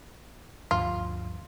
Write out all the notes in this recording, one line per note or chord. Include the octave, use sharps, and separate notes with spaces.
D2 G2 F3 F4